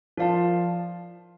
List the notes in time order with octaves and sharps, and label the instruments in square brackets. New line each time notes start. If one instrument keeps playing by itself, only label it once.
[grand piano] F3 [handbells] F4 A#4 D5 F5 A5